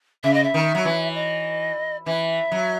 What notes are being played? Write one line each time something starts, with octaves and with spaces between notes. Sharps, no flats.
C#3 E5
D#5
E5
D#3
F#3
E3
D#5
E3 E5
F#3